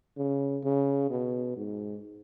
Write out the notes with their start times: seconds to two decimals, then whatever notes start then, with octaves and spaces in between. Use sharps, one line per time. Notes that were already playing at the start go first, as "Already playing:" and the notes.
0.17 C#3
0.63 C#3
1.10 B2
1.56 G#2